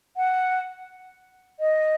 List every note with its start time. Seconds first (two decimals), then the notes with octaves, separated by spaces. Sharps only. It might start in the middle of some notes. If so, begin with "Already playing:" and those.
0.16 F#5
1.59 D#5